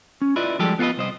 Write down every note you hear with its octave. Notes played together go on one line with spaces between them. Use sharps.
C#4
E4 F4 B4 D5 D#5
F3 G3 G#3 G4 A4
B3 F4 F#4 B4 D#5
C2 C5 D#5